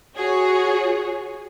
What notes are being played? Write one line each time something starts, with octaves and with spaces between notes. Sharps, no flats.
F#4 G#4 C#5